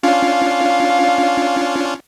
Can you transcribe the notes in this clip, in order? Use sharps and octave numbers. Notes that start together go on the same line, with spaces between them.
C#4 D4 F4 F5